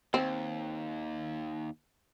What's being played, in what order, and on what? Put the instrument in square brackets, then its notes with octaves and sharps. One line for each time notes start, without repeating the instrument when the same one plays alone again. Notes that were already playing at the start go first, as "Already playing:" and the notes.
[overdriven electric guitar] D#2 [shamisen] C4